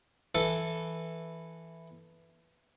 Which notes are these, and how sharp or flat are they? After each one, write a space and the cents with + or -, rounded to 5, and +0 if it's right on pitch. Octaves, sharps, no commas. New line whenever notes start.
E3 +0 A4 +0